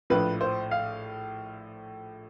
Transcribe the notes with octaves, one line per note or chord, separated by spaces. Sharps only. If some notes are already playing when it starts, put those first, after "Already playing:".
A#1 A2 F3 B4
C5
F5